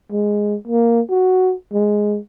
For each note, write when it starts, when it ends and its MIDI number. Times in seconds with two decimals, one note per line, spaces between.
0.12 0.56 56
0.68 1.01 58
1.10 1.53 66
1.73 2.18 56